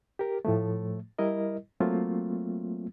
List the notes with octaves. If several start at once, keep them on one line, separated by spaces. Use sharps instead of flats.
G4 A#4
A2 F3 A3
G3 E4 A#4 D#5
F#3 A3 A#3 C4 F4